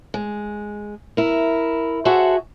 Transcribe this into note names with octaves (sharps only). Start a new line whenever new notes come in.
G#3
E4 A#4
F#4 G#4 A4 C5 E5 F#5